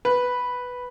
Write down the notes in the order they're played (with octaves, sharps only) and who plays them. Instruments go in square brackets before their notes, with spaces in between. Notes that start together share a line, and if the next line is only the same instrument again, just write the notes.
[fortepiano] B4